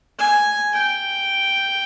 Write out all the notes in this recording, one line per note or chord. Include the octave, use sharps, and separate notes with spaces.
G#5
G5